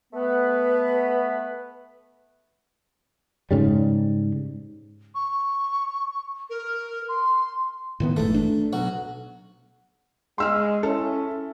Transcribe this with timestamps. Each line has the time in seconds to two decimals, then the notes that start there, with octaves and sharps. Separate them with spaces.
0.13 A3 B3 B4
3.51 G#2 C#3 G3
5.15 C#6
6.50 A#4
7.08 C6
8.00 A2 D#3 B3
8.17 F#1 G#2 E3 A3
8.34 D4
8.73 B1 F#4
10.38 G#3 C6 E6 F6
10.83 C#4 E4 A4